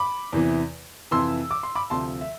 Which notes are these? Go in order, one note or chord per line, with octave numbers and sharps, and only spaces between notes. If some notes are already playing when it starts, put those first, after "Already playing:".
Already playing: B5 D6
E2 C3 E3
F2 C3 E3 C6 E6
D6
C6
B5 D6
D2 C3 F3 A5 C6
E5